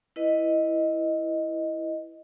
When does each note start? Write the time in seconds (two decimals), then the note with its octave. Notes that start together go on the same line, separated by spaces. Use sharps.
0.16 E4 B4 D#5